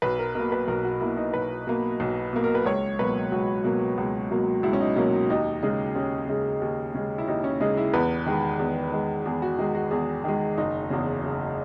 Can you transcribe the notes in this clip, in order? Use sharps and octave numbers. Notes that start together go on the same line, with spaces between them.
B1 B4
A#4
B2 A#3 A#4
B4
B1 A#4
F#4
B2 A#3 E4
D#4
B1 B4
B2 A#3
B1
B2 A#3
A#4
B4
C#2 C#5
B2 F#3 A#3 B4
C#2 F#4
B2 F#3 A#3
C#2
B2 F#3 A#3
C#2 E4
C#4
D#4
B2 F#3 A#3 C#4
D#2 D#4
C#3 G#3 D#4
D#2 C#4
C#3 G#3
D#2
C#3 G#3
E4
D#2 D#4
C#4
C#3 G#3 D#4
E4
E2 B4
D#3 G#3
E2
D#3 G#3
E2 G#4
F#4
D#3 G#3 D#4
F#4
E2 G#4
D#3 G#3
F#1 D#4
E2 C#3
F#1